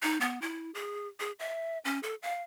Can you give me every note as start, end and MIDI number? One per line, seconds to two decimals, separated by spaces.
0.02 0.18 63
0.21 0.39 59
0.42 0.71 64
0.74 1.08 68
1.20 1.32 68
1.39 1.78 76
1.85 2.00 61
2.03 2.15 69
2.22 2.43 77